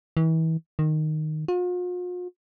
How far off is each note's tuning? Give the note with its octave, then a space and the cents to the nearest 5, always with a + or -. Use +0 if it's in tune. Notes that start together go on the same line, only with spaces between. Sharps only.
E3 -35
D#3 -10
F4 +45